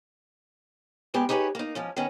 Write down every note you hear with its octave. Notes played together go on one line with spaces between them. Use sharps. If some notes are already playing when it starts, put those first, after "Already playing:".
D3 G#3 B3 G4 G#4
D#4 G4 G#4 B4 C#5
A#3 D#4
G#2 F3 C#4
D#3 B3 C#4